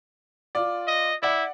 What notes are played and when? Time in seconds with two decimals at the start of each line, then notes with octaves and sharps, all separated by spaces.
0.55 F4 D5
0.88 D#5
1.23 E4 D5 F#5